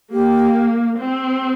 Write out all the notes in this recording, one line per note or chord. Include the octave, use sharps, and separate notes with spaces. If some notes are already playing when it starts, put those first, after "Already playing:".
A#3 G4
C4